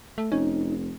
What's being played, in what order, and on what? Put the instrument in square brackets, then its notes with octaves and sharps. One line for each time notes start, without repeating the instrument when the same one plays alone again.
[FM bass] A3
[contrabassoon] F1 [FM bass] C#4 [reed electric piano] D#4